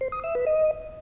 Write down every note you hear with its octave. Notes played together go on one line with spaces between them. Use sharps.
C5
D#6
E5
B4
D#5